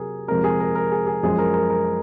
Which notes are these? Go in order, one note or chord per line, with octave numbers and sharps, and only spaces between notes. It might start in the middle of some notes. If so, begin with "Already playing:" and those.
Already playing: C3 F#3 G#4 A#4
F2 C3 F3 G#3 A#4
G#4
A#4
A#4
G#4
G#4
F#2 F3 G#3 G#4
A#4
A#4
A#4